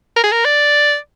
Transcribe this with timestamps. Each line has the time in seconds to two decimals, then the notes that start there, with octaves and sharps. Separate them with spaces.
0.17 A#4
0.24 G#4
0.32 A#4
0.45 D5